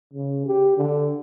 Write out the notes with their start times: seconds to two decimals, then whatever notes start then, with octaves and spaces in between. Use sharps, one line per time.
0.14 C#3
0.46 G4
0.77 D3